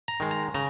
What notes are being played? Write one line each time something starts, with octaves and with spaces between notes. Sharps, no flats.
A#5
D#3 G#3
A#5
C#3 A#5